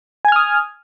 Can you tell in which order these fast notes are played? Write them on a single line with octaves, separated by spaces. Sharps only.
G#5 G#6 F6 D#6